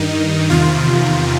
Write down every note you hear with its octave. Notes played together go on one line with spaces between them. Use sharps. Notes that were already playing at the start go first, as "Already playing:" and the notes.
Already playing: G2 D#3 D#4
E2 C3 D#3 F4